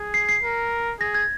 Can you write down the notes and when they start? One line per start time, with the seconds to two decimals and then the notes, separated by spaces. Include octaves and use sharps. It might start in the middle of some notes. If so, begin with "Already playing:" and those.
Already playing: G#4
0.14 C7
0.29 C7
0.43 A#4
1.00 G#4 A#6
1.14 G#6